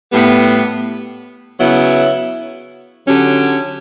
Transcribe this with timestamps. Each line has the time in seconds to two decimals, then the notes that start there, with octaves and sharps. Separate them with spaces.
0.11 A2 G3 B3
1.59 C#3 F#3 B3 E4
3.06 D3 F#3 C#4 G4